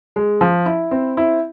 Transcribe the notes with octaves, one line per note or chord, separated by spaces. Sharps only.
G#3
F3
E4
C4
E4